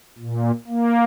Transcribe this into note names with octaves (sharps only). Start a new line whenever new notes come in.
A#2
A#3